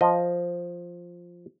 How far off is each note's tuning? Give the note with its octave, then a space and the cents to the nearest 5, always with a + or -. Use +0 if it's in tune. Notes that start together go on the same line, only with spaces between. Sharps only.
F3 +0 D#5 +0